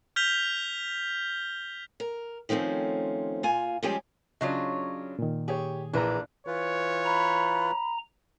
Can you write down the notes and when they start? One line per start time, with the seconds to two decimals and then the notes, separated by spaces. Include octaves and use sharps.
0.16 F6 G6 B6 F7 G7
2.00 A#4
2.49 D#3 F3 A3 C4 C#4
3.43 A#2 F4 G#5
3.83 F3 G3 G#3 C#4 G4 G#4
4.41 C#3 F#3 C#4 D4 F4 D#5
5.19 A#2 D#3
5.48 G4 G#4 C#5
5.93 A#1 E3 D4 G#4 B4 A#5
6.47 E3 F4 B4 C#5
7.05 A#5 B5